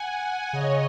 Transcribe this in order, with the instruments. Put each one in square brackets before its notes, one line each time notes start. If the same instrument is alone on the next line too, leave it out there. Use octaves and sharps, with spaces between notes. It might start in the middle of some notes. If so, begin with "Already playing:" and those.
Already playing: [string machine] F#5 G#5
[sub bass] C#3 [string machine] C#5 D#5